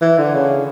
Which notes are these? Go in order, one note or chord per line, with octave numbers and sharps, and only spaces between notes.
E3
D3
C#3